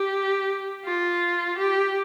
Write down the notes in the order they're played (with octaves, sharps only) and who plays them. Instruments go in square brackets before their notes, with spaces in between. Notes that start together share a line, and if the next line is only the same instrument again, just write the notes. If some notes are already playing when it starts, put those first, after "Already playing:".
Already playing: [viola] G4
F4
G4